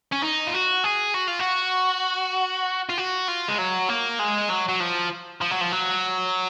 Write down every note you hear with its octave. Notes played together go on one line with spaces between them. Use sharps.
C#4
D#4
F4
F#4
G#4
F#4
F4
F#4
F4
F#4
F4
G#3
F#3
A#3
G#3
F#3
F#3
F3
F3
F#3
F3
F#3